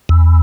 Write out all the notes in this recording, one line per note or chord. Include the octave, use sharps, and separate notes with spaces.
E2